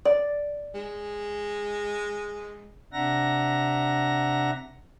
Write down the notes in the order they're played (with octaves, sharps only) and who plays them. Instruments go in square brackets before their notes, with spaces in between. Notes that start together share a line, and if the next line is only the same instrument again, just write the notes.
[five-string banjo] D5
[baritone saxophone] G#3
[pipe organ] C3 D4 E5 F#5 A#5 A#6